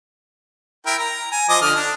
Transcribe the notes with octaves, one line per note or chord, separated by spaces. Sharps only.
E4 A#4 G5
A#5
G#5
F3 D#5 D6
D3 F6
D4